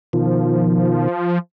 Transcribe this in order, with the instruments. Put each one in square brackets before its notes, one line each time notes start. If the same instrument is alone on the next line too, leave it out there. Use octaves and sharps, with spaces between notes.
[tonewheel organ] B2 D#3 [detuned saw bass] F3